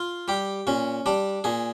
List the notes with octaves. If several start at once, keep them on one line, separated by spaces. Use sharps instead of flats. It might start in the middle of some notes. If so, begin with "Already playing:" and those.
Already playing: F4
G3 G4
A#2 C#4
G3 D4
A#2 G#4